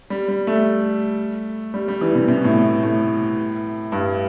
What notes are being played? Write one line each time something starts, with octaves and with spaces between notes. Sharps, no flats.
G3
G3
A3
G3
G3
E3
C3
C3
B2
A2
B2
A2
G2